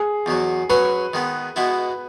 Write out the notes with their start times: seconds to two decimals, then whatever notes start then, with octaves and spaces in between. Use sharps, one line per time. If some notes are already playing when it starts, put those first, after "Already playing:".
Already playing: G#4
0.26 E2 B2 F#3
0.70 F#3 C#4 G#4 B4 C#5
1.13 D#3 G#3 B3
1.56 B2 G#3 B3 E4